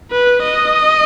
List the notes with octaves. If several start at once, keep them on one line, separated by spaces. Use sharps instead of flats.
B4
D#5